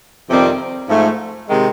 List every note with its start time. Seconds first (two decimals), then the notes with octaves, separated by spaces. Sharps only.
0.30 F2 C3 D#3 G3 C4
0.89 G#2 F3 A3
1.47 C3 D#3 G#3